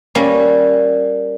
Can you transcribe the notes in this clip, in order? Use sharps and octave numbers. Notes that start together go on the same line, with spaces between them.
G3 A#3 C#4